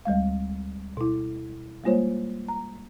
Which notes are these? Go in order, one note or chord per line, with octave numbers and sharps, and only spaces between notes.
D2 G3 G#3 F5
B2 E4
G3 G#3 A#3 F4 C5 C#5
A#5